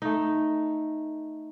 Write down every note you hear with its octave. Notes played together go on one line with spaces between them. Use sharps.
A3 D#4